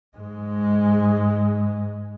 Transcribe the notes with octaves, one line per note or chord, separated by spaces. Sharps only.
G#2 G#3